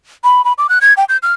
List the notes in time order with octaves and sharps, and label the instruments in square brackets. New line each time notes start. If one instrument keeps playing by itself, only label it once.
[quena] B5
B5
D6
F#6
G#6
G5
G6
F6